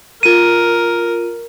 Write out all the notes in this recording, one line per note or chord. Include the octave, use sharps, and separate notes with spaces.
F4 A#4 D#7